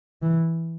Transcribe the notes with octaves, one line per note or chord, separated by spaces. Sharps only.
E3